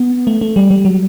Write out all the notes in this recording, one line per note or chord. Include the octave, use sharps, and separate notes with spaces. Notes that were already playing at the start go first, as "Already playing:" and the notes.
Already playing: B3
A3
A3
G3
G3
F#3